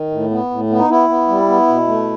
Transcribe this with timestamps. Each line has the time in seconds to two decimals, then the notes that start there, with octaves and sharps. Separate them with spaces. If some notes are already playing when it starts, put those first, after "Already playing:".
Already playing: D#3
0.11 A2
0.31 B3
0.50 A2
0.70 B3
0.78 D#4
0.89 B3 E4
1.09 B3
1.28 G3
1.48 B3
1.68 B2
1.88 A3